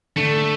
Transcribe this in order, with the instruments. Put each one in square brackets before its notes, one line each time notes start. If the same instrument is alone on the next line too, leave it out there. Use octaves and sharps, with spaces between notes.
[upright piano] D3 [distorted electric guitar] A3